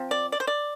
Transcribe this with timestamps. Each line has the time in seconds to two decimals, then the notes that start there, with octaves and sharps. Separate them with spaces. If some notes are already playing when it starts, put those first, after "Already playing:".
Already playing: F3 C4
0.11 D5
0.32 D5
0.40 C5
0.47 D5